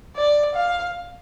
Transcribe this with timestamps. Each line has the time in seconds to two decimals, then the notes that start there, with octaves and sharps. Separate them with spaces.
0.17 D5
0.55 F5